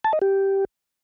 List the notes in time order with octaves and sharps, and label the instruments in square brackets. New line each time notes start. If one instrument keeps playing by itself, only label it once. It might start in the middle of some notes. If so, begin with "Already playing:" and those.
[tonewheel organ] A5
D#5
G4